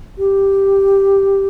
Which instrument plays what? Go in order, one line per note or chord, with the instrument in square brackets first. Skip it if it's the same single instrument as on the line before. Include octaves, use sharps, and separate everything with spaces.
[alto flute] G4